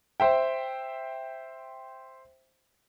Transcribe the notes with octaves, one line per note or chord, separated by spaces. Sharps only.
C5 E5 G5